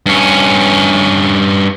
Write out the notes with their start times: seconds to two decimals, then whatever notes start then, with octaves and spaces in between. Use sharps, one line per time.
0.06 G2 C#4